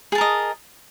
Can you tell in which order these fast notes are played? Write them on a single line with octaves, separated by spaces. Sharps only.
G#4 A5 A#4 D#5